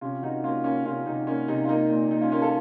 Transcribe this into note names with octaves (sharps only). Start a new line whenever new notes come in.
C3 C#4 F4
D#3 D#4 F#4
A#3 C#4 F4
A#3 C#4 F4
C3 C#4 F4
C3 D#4
A#3 C#4
C3 D#4
F4
A#3 D#4
A#2
A#2 D#4
C#4 F4
A#3 C#4 F4
F4 A4